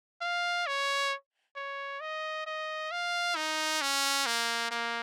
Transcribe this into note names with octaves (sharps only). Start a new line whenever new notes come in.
F5
C#5
C#5
D#5
D#5
F5
D#4
C#4
A#3
A#3